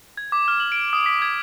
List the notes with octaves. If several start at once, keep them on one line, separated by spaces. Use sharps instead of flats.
G#6
D6
F6
F#7
D7
D#6
B6
G#6